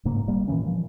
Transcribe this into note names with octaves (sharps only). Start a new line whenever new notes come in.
G#2 C#3 A#3
G1 G3 A#3
A#2 D#3 E3 C#4
F3